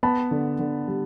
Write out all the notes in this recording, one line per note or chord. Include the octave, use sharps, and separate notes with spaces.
B3 A5 B5
D3
D3
G3